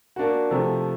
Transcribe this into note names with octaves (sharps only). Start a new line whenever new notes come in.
A#3 D4 F#4
C3 F3 A3